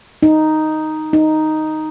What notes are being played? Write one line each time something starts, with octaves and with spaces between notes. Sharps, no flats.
D#4
D#4